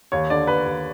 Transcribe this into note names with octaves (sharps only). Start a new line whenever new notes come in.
D#2 C#5
D3 D5
D#2 B4
D#2